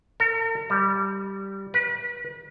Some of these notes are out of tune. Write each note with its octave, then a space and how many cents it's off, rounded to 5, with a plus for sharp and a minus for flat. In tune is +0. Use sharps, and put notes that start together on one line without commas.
A#4 -45
G3 -5
B4 -40